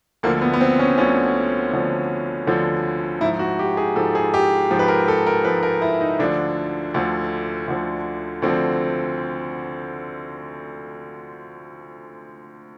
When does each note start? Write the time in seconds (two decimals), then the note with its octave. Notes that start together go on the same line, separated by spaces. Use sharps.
0.23 D2 D3 F3 A#3
0.41 B3
0.54 B3
0.61 C4
0.79 C#4
0.98 D2 D3 F3 C#4
1.73 D2 D3 F3
2.47 D2 D3 F3
3.21 G#2 E4
3.25 F3
3.39 F#4
3.59 G4
3.77 G#4
3.96 G#2 F3 A4
4.15 G#4
4.34 G4
4.71 G#2 F3
4.79 B4
4.88 A#4
5.08 A4
5.27 A#4
5.45 G#2 F3 B4
5.63 A#4
5.82 E4
6.01 D#4
6.19 D2 D3 F3 D4
6.94 D2 D3 F3
7.68 D2 D3 F3
8.42 D2 D3 F3 C4